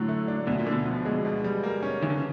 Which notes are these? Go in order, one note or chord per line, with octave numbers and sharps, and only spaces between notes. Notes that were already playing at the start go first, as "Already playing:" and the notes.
Already playing: A2 D3 F#3
A3
D4
D2 B2
A#2
D3
B2
F3
G#3
B2
G3
A#3
C#4
D#3 E3
D3
C#3